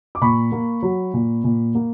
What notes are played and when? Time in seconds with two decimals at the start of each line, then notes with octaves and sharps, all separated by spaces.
0.15 D6
0.21 A#2 B5 C#6
0.52 A#3
0.82 F#3
1.14 A#2
1.44 A#2
1.75 A#3